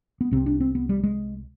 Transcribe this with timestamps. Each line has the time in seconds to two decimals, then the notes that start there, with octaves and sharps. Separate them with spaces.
0.21 B3
0.31 C2 C3 C4
0.46 D4
0.60 C4
0.75 B3
0.89 G3
1.03 G#3